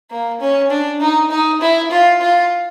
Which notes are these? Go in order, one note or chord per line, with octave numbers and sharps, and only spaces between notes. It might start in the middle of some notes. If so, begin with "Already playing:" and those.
A#3
C#4
D4
D#4
D#4
E4
F4
F4